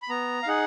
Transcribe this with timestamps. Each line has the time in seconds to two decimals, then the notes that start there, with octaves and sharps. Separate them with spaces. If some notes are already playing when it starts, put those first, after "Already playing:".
0.02 B5
0.10 B3 A#5
0.43 F5
0.47 D#4 G#4 F#5